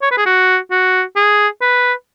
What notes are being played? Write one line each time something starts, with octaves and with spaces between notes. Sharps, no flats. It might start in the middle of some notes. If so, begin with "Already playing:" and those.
C#5
B4
G#4
F#4
F#4
G#4
B4